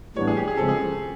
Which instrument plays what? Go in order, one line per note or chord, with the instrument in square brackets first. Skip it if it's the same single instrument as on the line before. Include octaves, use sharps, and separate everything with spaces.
[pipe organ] A2 E3 G3 B3 D4 [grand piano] C#5
[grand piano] G#4
G4
G#4
[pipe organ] C#3 F3 G#3 C4 [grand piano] A4
[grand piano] G#4